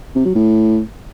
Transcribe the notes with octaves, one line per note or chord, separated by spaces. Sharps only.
C3
F#3
A2